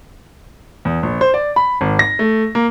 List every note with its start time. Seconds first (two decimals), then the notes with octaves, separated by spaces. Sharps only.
0.85 E2
1.03 A#1
1.21 C5
1.34 D5
1.56 B5
1.81 G#1
1.99 A#6
2.19 A3
2.55 A#3